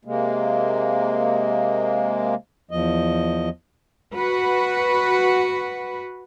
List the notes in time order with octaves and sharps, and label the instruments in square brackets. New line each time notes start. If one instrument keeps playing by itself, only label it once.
[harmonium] C3 G#3 A#3
E2 F3 D#5
[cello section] F#4 B4